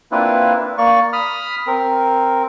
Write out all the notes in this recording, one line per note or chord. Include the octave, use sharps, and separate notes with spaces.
A#3 C4 D4 E4 F4 B4
A#3 D5 C#6
B5 D#6 F6
C4 A#4